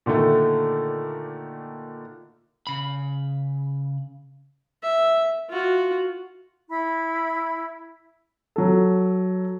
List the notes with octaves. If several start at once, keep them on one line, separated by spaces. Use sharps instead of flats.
A#2 D3 D#3 A3
C#3 B5
E5
F4 F#4
E4 B5
F#3 A4